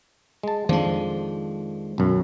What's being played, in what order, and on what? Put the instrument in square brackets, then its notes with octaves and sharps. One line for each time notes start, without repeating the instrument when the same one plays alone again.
[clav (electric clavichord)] G#3 A5
[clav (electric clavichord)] F2 F3 D4 [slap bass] D#3 G#3
[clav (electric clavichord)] B1 F#2